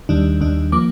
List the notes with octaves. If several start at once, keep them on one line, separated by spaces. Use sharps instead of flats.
D#2 D#3 G3 D4
D#2 D#3 G3 D4
F3 A#3 D6